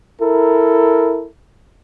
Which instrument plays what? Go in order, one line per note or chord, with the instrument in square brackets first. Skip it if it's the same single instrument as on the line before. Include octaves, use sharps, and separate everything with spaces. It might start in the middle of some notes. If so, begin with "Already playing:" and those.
[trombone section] E4 A4 A#4